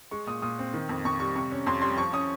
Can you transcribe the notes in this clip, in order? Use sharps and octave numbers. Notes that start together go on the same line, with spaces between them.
G#3 C#6
A#2 D#6
A#2 D#6
C4
D#3
F2
F2 C#6
G3 C#6
C3 C#6
C#4
F2 C6
G3 C6
F3 C#6
C#4 D#6